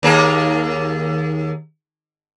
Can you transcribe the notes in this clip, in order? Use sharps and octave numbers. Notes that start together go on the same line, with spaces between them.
D#2 A#3 G#4